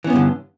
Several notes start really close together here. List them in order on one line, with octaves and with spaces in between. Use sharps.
E3 C#4 B3 G2 D3